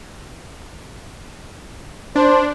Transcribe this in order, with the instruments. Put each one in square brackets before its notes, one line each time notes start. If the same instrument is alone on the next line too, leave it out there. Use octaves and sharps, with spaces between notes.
[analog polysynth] D4 [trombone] C5